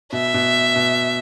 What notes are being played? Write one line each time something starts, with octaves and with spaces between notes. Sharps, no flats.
B2 E5
B2
B2